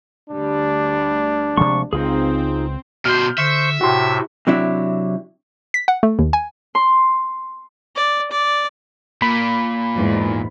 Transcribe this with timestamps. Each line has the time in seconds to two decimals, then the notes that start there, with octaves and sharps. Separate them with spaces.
0.30 D2 G3 D4
1.57 C3 F3 G#3 C#6
1.93 C#2 C4 D#4 F4 G#4
3.05 B2 F#4 C5 F6 G6
3.38 D3 C5 E5 C#6
3.81 A2 C3 F#4 G5 C6
4.47 C3 F#3 D4 E4
5.74 B6
5.88 F#5
6.03 A3
6.19 D#2
6.33 G#5
6.75 C6
7.96 D5
8.31 D5
9.22 A#2 B5
9.95 E2 G#2